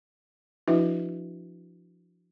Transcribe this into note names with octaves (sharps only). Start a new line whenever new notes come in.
F3 D4 E4 F#4 B4 E5